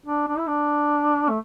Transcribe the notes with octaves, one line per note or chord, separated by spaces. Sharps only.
D4
D4
E4
D4
A3